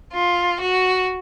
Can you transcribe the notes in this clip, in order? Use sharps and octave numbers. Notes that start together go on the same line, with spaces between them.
F4
F#4